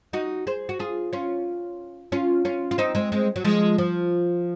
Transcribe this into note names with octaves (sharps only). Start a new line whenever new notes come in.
D#4 F#4
G#4 C5
F#4
F4 G#4
C#4 F4
C#4 F4
C#4 F4
F4
C4 D#4
G#3 C4
G#3 C4
F#3
F3 G#3
F3